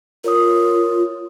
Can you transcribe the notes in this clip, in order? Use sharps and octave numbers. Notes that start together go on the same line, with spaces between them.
F4 A#4 C#5 D#6